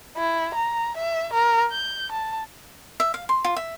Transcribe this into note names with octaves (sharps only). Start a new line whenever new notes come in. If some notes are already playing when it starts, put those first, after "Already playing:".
E4
A#5
E5
A#4
G6
A5
E5
F5
C6
F4
E5